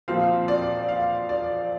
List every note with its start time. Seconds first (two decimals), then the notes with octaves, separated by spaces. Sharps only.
0.08 A#2 F3 C4 F5
0.48 D5
0.88 F5
1.29 D5